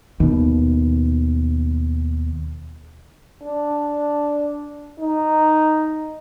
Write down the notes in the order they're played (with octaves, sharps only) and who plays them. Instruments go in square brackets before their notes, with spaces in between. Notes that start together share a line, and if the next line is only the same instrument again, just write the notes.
[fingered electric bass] D#2 B2
[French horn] D4
D#4